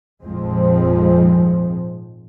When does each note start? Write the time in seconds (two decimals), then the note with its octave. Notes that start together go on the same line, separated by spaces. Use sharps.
0.22 G#1 F2 A#2 F3 G#3 C4